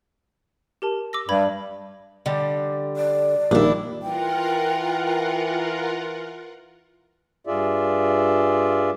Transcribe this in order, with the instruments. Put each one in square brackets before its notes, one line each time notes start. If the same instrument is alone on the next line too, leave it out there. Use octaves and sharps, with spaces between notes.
[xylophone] G4 A#4 A5
D6 E6 A#6
[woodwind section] G2 G3 [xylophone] B5 G#6 F#7
[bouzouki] D3 G3
[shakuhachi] D5
[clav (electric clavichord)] A#1 [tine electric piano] D#3 G3 [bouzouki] D4 E4
[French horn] E3 [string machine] F4 A#4 F#5 [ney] G5
[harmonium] G2 F4 G#4 D5 E5